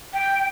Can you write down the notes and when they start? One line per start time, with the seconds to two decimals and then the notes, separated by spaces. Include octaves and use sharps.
0.13 G5